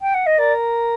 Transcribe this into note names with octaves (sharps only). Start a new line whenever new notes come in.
G5
F#5
D#5
A#4 D5